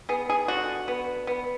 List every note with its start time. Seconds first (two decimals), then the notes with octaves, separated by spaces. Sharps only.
0.09 B3 G#4
0.30 G#4
0.48 D3 F#4
0.88 B3
1.27 B3